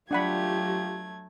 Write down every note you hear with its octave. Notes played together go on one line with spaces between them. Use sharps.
F#3 A3 D4 F4 G4 F#5 B5 G#6